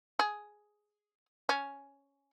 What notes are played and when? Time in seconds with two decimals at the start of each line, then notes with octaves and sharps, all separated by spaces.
0.19 G#4
1.49 C#4